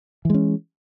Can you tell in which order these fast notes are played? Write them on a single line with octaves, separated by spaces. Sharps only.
E3 G#3 C#4